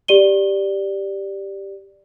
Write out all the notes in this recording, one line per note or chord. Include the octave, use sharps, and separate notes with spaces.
G4 D5 D#7 G7